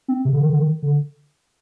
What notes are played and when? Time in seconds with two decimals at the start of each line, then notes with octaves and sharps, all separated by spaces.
0.08 C4
0.25 C3
0.33 D3
0.41 D#3
0.49 D3
0.58 D#3
0.83 D3